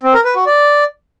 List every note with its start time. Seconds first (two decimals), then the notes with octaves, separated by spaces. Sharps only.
0.03 C4
0.14 A#4
0.25 B4
0.35 F#4
0.46 D5